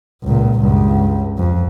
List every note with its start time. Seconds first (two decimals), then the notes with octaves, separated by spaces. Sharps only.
0.23 C#2 A#2
0.59 C#2 G2
1.38 F2